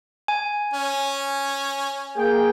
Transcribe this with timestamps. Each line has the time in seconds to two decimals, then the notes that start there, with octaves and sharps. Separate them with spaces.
0.28 G#5
0.73 C#4
2.17 A#3 G#4 G5